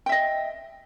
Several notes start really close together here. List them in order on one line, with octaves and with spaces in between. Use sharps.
G5 E5 D#5